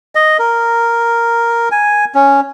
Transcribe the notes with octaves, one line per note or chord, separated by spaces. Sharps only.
D#5
A#4
G#5
C#4